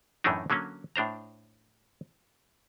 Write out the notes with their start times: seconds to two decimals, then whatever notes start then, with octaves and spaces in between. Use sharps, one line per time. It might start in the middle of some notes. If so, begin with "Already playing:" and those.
0.24 F#2 A2 E3 A3 D4 D#4
0.50 D3 F#3 A#3 C#4
0.96 A2 D4 C5 A#5